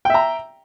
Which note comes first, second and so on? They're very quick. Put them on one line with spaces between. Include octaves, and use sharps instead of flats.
G5 E5 A#5